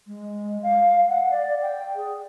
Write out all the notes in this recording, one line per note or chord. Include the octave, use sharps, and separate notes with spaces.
G#3
F5
F#5
D5
G5
G#4